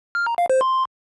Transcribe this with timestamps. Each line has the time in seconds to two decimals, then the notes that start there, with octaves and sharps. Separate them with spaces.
0.15 F6
0.27 A#5
0.38 F5
0.50 C5
0.61 C6